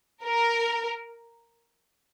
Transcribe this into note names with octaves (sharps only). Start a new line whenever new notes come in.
A#4